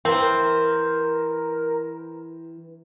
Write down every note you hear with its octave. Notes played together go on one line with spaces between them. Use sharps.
E3 C4 A#4